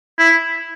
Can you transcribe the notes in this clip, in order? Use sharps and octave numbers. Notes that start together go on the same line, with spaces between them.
E4